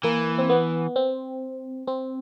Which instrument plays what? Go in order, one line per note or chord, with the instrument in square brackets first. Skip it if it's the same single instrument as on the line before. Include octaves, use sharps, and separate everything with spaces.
[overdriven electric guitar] E3 [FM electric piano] A#3
[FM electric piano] C4
B3
C4
C4